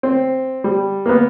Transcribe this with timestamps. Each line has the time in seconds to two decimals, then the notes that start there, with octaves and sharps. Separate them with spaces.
0.03 C4
0.64 G3
1.06 A#3 B3